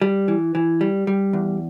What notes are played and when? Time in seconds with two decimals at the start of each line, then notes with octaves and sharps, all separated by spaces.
0.02 G3
0.28 E3
0.55 E3
0.81 G3
1.07 G3
1.33 E2